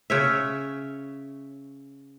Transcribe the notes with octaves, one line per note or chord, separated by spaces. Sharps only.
C#3 C#5 E5